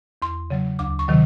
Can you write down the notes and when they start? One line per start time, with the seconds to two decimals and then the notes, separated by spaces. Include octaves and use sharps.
0.22 E2 C6
0.50 C#3 F#3
0.79 D2 D6
0.99 C#6
1.08 C3 D#3 F#3